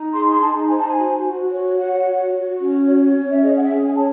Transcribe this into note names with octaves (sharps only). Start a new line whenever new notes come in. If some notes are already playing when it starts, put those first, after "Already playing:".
Already playing: D#4
G#4 C6
C6
D#4 A5
C5 G#5
A5
G#5
F#4
F#4
C#5
C#5 F#5
F#4
F#4
C#4
C#5
C#4
E5
G#4 D#5
F#5
E5
C#4
G#5
C#5 A5